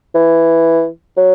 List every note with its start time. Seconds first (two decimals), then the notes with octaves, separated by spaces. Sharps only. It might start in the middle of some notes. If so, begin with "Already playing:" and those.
0.14 E3
1.17 F#3